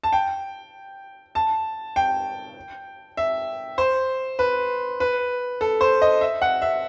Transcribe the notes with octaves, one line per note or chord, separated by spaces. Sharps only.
A5
G5
A5
G5
E5
C5
B4
B4
A4
C5
D#5
E5
F#5
E5